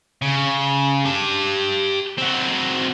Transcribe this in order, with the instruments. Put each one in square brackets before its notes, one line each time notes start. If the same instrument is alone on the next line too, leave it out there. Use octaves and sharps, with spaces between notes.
[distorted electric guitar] C#3
G4 A5
C4 F#4